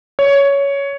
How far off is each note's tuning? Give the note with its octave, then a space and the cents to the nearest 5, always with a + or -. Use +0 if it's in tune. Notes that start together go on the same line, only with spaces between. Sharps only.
C#5 +10